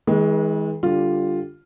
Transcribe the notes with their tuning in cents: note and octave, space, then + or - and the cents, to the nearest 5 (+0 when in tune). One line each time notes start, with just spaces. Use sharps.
E3 -45 G#3 +5 B4 -35
D3 -10 G3 +0 F4 +0